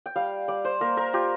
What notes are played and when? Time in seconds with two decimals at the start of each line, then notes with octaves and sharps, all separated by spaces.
0.06 G5
0.16 G3 F5
0.48 G3 D5
0.65 C5
0.81 A#3 A#4
0.97 A#4
1.13 F4 G4